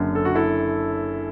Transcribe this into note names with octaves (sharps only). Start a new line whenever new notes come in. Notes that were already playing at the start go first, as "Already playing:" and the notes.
Already playing: F#1 F#2 D3
A4
F#4
E4 A4